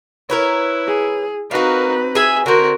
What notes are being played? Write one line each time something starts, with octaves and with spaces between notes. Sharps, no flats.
E4 A#4 B4 C#5
G#4
C4 D#4 F#4 A#4 B4 F5
G#4 E5 G#5
D3 C4 F#4 A#4